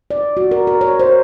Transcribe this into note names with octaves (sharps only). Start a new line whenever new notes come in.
D5
F#4
A#4
A#4
C#5
C5